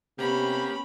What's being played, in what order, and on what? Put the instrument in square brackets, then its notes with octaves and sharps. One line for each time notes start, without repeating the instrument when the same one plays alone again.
[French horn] C3 [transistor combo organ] A#3 G4 [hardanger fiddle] B3 C#4 [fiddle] B5